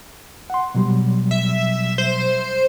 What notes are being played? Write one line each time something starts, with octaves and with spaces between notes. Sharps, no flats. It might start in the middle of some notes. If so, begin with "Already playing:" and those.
F#5 C6
B2 F#3 G3
E5
C5